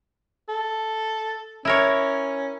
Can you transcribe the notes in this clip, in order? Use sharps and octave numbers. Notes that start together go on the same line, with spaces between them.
A4
C#4 E4 A#4 C#5